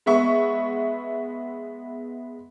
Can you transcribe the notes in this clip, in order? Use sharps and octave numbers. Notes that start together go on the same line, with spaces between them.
G#3 B3 E5 C#6